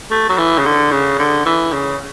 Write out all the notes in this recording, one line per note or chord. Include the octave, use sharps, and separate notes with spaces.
A3
F#3
E3
C#3
D3
C#3
D3
E3
C#3